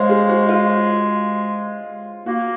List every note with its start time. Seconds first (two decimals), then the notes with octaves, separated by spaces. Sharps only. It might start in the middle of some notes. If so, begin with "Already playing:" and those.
Already playing: G#3 C5 C#5 F5
0.09 G#4
0.29 F#4
0.49 F4
2.26 A#3 F#4